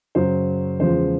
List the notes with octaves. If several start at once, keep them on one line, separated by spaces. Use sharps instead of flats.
F#2 C#3 F#3 C5
E2 C#3 F3 G#3 C5